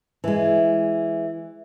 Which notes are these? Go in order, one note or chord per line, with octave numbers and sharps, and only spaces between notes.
E3 G#3